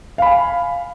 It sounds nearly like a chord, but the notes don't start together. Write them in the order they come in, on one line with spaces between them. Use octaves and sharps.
F5 B5 G#5